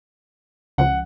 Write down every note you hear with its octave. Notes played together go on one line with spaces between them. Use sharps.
C#2 C#3 F3 F#5